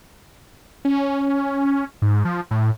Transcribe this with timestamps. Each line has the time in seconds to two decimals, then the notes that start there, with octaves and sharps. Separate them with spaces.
0.85 C#4
2.02 G#2
2.25 F3
2.51 A2